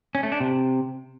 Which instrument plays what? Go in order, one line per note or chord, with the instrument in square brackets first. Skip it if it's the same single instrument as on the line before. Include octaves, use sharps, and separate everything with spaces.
[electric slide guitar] C#4
A3
D4
C3